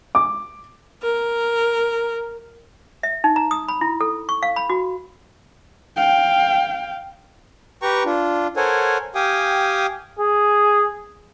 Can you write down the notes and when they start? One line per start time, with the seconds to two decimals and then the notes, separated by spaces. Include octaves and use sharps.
0.15 D6
1.02 A#4
3.03 E5
3.24 D#4
3.36 A#5
3.51 D#6
3.68 B5
3.81 E4
4.01 A4
4.29 C#6
4.43 F5
4.56 B5
4.70 F#4
5.96 F5 G5
7.82 G4 B4 G5 A#5 C#6
8.05 D4 F4
8.56 A4 A#4 C5 C#5 F#5 G#5
9.15 G4 F5 G5 G#5 D#6
10.19 G#4